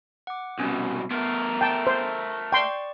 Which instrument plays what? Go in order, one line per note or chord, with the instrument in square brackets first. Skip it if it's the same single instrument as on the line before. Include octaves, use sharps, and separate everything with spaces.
[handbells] F#5 D6
[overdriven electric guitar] C2 B2 [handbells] B3 C#4 G#5
[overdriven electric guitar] A3 A#4 [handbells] B3
[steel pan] G5 A5
C5
[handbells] D5 C#6 [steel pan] G5 C6